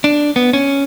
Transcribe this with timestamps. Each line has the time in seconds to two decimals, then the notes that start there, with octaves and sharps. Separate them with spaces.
0.04 D4
0.36 B3
0.53 C#4